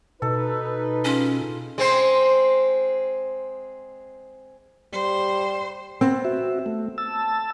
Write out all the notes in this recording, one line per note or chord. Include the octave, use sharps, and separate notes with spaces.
B2 D#4 A4 B4
C#4 F4 G#4
G#3 C4 C5
G3 C5
B3 C4
F#4 E5
A3
A5 E6